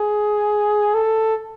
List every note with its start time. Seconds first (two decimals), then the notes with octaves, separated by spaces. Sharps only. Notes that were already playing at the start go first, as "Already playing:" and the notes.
Already playing: G#4
0.94 A4